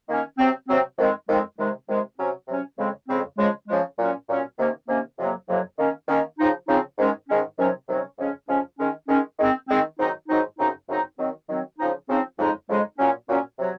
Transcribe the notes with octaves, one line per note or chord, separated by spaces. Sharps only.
D#3 A#3 C#4
C3 F#3 C4
C3 F#3 C4
F2 D#3 G#3 C4
F2 D#3 G#3 C4
C3 D#3 G#3
C3 D#3 G#3
C3 F#3 C#4
C3 F#3 C#4
F2 C#3 G#3 C4
F2 C#3 G#3 C4
C#3 F3 G#3
C#3 F3 G#3
A#2 F#3 C#4
A#2 F#3 C#4
C3 D#3 A#3 C#4
C3 D#3 A#3 C#4
F2 C3 F#3 A#3
F2 C3 F#3 A#3
D#3 A#3 C#4
D#3 A#3 C#4
C#3 F3 C4 D#4
C#3 F3 C4 D#4
G#2 D#3 G#3 C#4
G#2 D#3 G#3 C#4
C3 D#3 F#3 C#4
C3 D#3 F#3 C#4
F2 C#3 F3 G#3 C#4
F2 C#3 F3 G#3 C#4
D#3 G#3 C#4
D#3 G#3 C#4
D#3 G#3 C4
D#3 G#3 C4
G#2 D#3 F#3 C4 D#4
G#2 D#3 F#3 C4 D#4
F#2 C#3 F#3 C4 D#4
F#2 C#3 F#3 C4 D#4
D#3 F#3 C4
D#3 F#3 C4
C#3 F3 C4 D#4
C#3 F3 C4 D#4
F2 C#3 G#3 D#4
F2 C#3 G#3 D#4
A#2 F#3 C#4
A#2 F#3 C#4
C3 F#3